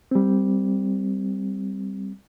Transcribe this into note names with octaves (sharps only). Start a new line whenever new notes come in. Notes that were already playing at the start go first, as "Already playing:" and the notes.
G3 C4